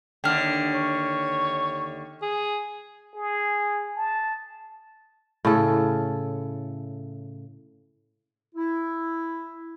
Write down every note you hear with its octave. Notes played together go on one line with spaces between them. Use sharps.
D#2 D3 G5 F6
C#5
G#4
G#4
A5
A2 C#3 A4
E4